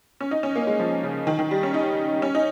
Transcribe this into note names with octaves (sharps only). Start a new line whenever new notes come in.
C#4
D#4
C#4
A#3
G#3
F3
C#3
D#3
D#3
G3
C#4
D#4
C#4
D#4